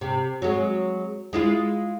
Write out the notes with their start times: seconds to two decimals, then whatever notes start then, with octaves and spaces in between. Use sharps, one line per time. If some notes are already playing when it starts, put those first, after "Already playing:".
0.01 C3
0.42 F#3 G#3
1.33 G#3 E4 F4